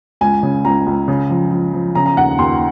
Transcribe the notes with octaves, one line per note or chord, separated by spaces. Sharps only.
C#2 G#5
C#3
C#2 A#5
C#2
C#3
F3
F3
F3
C#3 A#5
A#5
D#2 F#5
D#2 C6